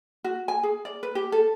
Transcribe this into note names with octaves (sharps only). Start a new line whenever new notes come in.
F#4
G#5
G#4
D5
B4
G4
A4